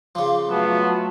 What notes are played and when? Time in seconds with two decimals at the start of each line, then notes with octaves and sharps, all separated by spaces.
0.15 C#3 F3 C6 D6
0.50 F#3 A3 B3 F4 F#4 A5